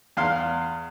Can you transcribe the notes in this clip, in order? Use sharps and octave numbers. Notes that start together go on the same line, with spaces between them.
E2 F5 C6